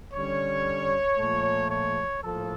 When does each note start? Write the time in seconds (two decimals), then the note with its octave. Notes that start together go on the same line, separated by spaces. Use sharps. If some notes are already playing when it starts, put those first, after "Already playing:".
0.14 D3 G3 C#4 C#5
1.18 A#2 F3 A3
1.71 C#5
2.23 A2 F3 A#3 A4